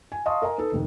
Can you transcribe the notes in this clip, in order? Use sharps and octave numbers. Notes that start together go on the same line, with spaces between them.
G#5
D#5 F5 A5 C6 C#6 D#6
A#4 D#5 G#5 A#5
D#4 A4 B4
F1 D#2